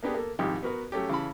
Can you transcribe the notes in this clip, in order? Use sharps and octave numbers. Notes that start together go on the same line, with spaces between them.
A#3 B3 D4 G4 G#4
A#3 A4
C2 G#2 D#3 F3 G4
B3 F#4 A#4 B4
F#3 A3 C#4 G4
C#3 E3 A5 B5